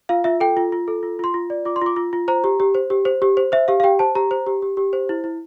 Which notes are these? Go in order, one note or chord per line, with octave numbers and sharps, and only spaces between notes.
F4 F5
F4 E5
A4 G5
F4
F4
A4
F4
F4 C6
F4
D5
F4 D6
C6
F4 D6
F4
F4
C5 A#5
G4
G4
C5
G4
C5
G4
C5
C5 E5
G4 F5
F5
G4 G5
C5 A5
G4 A#5
C5
G4
G4
G4
C5
E4
E4